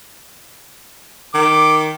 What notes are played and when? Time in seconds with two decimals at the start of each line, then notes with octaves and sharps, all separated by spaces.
1.34 D#3 D6